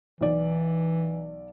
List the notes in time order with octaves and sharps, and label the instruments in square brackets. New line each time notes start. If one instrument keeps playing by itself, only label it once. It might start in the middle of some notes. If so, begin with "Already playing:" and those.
[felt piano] B1 D5 [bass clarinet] E3